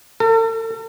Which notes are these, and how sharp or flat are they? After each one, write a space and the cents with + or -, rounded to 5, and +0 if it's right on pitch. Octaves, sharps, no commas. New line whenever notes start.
A4 +45